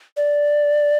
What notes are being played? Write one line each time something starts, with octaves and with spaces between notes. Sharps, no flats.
D5